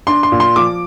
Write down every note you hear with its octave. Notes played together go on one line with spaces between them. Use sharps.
D4 C6
C6
A#2
C6
F3 D6